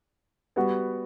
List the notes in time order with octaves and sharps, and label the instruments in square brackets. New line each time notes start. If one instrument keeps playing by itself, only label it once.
[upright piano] G3 B3 F#4